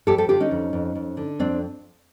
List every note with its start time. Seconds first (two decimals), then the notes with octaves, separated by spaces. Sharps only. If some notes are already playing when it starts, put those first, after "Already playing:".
0.07 F2 G4 A4
0.18 G4 A4
0.29 D3 F4 G4
0.40 C#4 D#4
0.51 F2
0.73 F2
0.95 F2
1.17 D3
1.39 F2 C4 D4